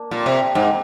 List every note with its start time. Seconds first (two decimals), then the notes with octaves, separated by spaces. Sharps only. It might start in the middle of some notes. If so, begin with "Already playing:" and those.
Already playing: A#3 D4
0.11 A#2 D3 G3 C4
0.26 C3
0.55 G#2